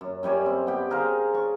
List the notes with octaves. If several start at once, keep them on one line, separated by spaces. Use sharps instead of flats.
F#2
F#2 G3 C#5 G#5
C4
B3 G4
G#4 A#4 C5 F5
D5 C#6